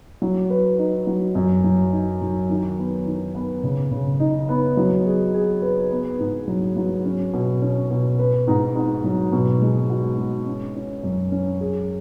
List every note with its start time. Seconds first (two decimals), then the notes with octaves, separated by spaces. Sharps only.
0.22 F#3
0.50 B4
0.78 D#4
1.07 F#3
1.35 F#2
1.64 F#3
1.92 D#4
2.21 F#3
2.50 D#3
2.78 B3
3.06 D#3
3.35 B3
3.63 C#3
3.91 C#3
4.20 D#4
4.49 B3
4.77 F#3
5.06 G#4
5.34 G#4
5.62 B4
5.91 B3
6.19 G#2
6.48 F#3
6.76 F#3
7.05 C#4
7.34 B2
7.62 C#4
7.90 B2
8.19 B4
8.48 G#2
8.76 G#2
9.04 F#3
9.32 B2
9.62 G#3
9.90 F#4
10.18 G#3
10.47 C#4
10.75 C#4
11.03 F#2
11.32 C#4
11.61 G#4